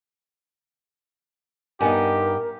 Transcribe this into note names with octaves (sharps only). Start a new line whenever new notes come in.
G2 B3 D#4 G4 A#4 F#5 G#5